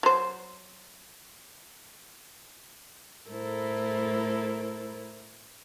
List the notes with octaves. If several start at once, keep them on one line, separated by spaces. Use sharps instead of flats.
F#3 C5
A2 A3 E4 A4 A#4 C5